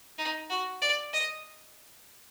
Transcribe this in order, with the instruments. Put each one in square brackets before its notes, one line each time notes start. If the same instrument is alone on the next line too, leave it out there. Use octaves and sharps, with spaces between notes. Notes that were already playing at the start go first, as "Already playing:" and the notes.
[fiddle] D#4
F#4
D5
D#5